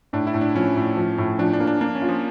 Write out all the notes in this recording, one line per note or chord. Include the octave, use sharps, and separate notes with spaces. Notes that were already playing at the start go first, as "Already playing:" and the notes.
A2 D4
E4
A2
D4
F3 C#4
A2
F3
A2
F3 D4
D4
A#3
D4
A#3 D4
C#4
F4
F3